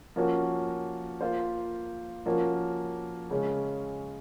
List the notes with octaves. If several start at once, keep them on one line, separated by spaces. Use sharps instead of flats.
F3 A#3 C#4 F#4
A#3 F4 C5
F3 A#3 C#4 F#4
C#3 G#3 C#4